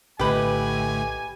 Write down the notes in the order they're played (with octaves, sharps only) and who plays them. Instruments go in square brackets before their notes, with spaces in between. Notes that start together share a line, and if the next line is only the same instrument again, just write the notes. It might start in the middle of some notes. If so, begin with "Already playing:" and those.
[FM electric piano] A#1 D#5 [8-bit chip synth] A2 D3 A3 [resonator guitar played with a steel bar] G4 B4 [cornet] G#5